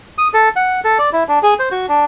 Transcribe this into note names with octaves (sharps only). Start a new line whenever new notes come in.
D#6
A4
F#5
A4
D5
E4
D4
G#4
C5
F#4
D4